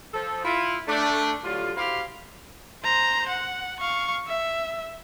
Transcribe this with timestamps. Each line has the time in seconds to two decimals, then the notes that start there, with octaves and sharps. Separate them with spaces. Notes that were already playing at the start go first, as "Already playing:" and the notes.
0.14 F3 A4
0.45 E4 F4
0.87 A3 D4
1.44 A2 D3 F#3 G3 F4
1.77 E4 F#4 G4 C5 F5
2.84 C5 A#5
3.28 F#5
3.79 F5 C#6
4.27 E5